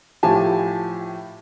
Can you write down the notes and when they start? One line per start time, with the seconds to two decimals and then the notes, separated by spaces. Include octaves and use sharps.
0.23 A2 F3 G4 G#5 A5